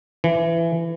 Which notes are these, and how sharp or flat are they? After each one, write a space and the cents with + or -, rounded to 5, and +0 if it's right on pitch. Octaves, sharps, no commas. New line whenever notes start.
E3 +20